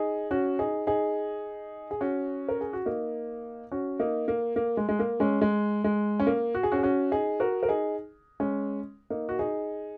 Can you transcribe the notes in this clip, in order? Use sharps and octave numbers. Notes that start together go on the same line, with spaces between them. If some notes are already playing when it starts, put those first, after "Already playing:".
Already playing: D#4 G#4
C#4 F#4
D#4 G#4
D#4 G#4
G#4
C#4 F#4
A#4
G#4
F#4
A#3 D#4
C#4 F#4
A#3 D#4
A#3
A#3
G#3
G#3
A#3
G#3 C#4
G#3
G#3
C#4
A#3
F#4
G#4
C#4 F#4
G#4
C#4 F#4
D#4 G#4
F#4 A#4
A#4
D#4 G#4
G#3 C#4
A#3 D#4
F#4
D#4 G#4